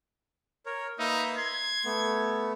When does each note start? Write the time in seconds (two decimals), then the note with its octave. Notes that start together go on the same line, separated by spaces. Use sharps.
0.66 A#4 C#5
0.99 A#3 D#4 B4 E5
1.38 C6 G#6
1.85 A3 B3